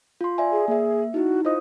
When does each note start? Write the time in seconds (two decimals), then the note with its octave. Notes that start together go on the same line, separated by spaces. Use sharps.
0.21 F4 C6
0.38 D5 E5 G#5
0.52 G#4
0.68 A#3 G#4 E5
1.14 D#4 E4 F#4
1.45 F4 C5 D#5 D#6